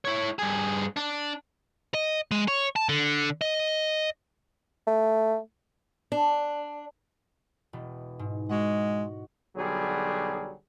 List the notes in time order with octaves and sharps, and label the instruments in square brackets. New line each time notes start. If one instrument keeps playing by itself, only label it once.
[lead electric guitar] E4 C#5
G2 G#4
D4
[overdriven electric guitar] D#5
G#3
C#5
A5
D3
D#5
[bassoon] A3
[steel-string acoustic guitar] D4
[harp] E1 B2
G#2
[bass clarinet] G#3 [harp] F#4 D#5 F#5
[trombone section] B1 D3 F#3 G3 G#4